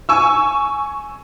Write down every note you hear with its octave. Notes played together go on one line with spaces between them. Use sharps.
G#5 C#6 E6